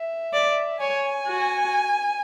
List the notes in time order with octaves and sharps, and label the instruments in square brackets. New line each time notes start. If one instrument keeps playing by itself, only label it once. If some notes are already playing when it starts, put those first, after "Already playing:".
Already playing: [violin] E5
[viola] D5
[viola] C#5 [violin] G#5
[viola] F#4